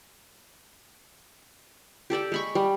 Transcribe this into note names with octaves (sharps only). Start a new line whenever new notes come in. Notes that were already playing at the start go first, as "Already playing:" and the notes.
G4 A4 D5 G5
G#3 B5 C#6
G3